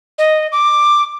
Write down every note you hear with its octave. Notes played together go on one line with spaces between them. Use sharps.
D#5
D6